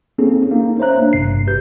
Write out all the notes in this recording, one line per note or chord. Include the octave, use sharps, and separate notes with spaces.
A#3 C4 C#4 D#4 G#4 A4
A#3 C#4 D#4
C5 C#5 E5 A#5 F#6
A#3 D4
G#1 G2 C3 C7
G#1 G4 B4 G6